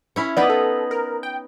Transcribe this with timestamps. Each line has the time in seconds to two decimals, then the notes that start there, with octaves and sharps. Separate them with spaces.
0.16 C#4 E4 C#5
0.37 B3 D#4 B4 D5
0.50 A4
0.91 A#4
1.23 G5